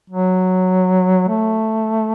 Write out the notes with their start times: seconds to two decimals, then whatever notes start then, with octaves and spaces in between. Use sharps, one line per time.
0.10 F#3
1.28 A3